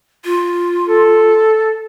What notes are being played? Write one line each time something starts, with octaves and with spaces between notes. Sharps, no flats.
F4
A4